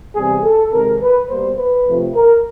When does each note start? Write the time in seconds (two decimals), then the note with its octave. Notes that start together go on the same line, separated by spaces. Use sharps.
0.15 C3 E3 G3 B3 G#4
0.44 A4
0.72 C3 D#3 G#3 A#4
1.01 B4
1.29 B2 G3 A#3 C5
1.57 B4
1.86 F2 C3 F3 A3 C4
2.15 A#4